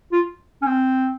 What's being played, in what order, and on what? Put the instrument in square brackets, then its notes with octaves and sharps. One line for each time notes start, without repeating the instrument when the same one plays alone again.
[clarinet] F4
C#4
C4